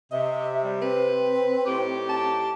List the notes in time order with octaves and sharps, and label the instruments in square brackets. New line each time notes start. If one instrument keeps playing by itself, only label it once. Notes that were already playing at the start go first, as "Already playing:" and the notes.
[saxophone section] C3 [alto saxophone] D#5 [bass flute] E5
[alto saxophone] G3
[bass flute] C4 [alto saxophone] B4
[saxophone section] A2 D#4 G4
[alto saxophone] A5